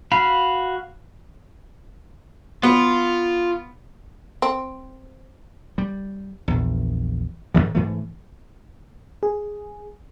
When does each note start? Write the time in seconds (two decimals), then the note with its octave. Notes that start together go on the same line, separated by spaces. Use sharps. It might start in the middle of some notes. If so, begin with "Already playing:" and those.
0.12 F#4 F5 B5
2.63 B3 F4
4.42 C4
5.78 G3
6.48 A#1 E2
7.54 G#2 C3 D#3 E3
7.75 G#2 E3 A3
9.23 G#4